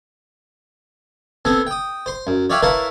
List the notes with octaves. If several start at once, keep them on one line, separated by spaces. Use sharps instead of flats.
B3 C4 A4 G#5
G5 D#6
C5 C6
F#2
C#5 D5 E5 F5 G5 G#5
E4 A#4 B4 C#5 F5 A5